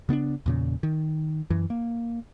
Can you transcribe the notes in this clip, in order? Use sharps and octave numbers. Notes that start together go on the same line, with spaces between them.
C#3 B3 C4 D4
E2 A#2 C#3
D#3
F#2 E3
A#3